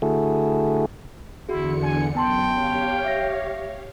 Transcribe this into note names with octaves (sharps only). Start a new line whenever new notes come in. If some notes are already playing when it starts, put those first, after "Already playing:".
D3 A3 E4 F#4 G#4 A4
E2 D3 E4 F#4 G#4 C#7
G#5
F#2 B3 G5 A5 C6
G4 C#5 F5
E5 A#6